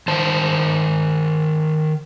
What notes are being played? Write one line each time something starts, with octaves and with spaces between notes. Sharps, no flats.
D#3 C5 A5